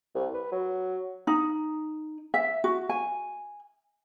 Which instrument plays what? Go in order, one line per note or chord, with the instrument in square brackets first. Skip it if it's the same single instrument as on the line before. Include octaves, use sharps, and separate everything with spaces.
[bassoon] C2
B4
F#3
[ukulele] D#4
E5
F#4
G#5